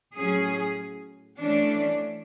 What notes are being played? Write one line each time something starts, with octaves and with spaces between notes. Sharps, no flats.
A2 F#3 C#4 G#4
E3 A3 C#4 D4